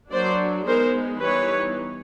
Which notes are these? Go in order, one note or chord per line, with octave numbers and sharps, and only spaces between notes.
F#3 A#3 D4 C5 D5
G#3 B3 D#4 A#4 C5
E3 G3 B3 D#4 B4 C#5